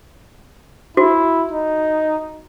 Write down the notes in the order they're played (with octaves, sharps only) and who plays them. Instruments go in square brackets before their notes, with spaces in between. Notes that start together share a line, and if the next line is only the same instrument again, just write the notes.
[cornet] E4 [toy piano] F#4
[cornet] D#4